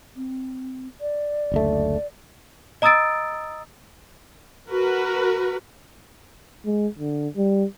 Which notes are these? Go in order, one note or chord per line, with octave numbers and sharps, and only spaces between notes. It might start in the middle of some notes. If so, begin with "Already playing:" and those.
C4
D5
F#1 D2 A3
D#5 A#5 D#6 E6 A6 D7
F#4 A#4 B4
G#3
D3
G3